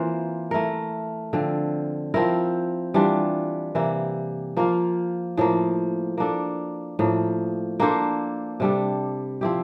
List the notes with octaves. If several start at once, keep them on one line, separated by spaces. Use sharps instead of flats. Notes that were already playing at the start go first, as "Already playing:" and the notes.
Already playing: E3 A#3 C4 F4 C5
A3 E4 A#4
D3 F3 C4 F4
F3 C4 E4 A#4
E3 G3 D4 F4
C3 E3 A#3 E4
F3 A#3 F4
A2 F3 A#3
A#3 D4 A4
A2 F3 A#3
A#3 D4 A4 C5
C3 G3 D4 A4
F3 C4 E4 G4